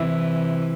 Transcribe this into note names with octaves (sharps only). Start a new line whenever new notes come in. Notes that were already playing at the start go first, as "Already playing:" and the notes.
Already playing: C3 E3 E4